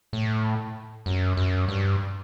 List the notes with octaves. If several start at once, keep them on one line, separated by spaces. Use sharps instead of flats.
A2
F#2
F#2
G2